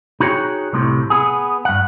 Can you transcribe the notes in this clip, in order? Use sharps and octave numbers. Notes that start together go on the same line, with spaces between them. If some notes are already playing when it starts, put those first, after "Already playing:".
D#4 F#4 G#4 C#5 G5
C2 A2 C3
B3 G#4
G2 F#5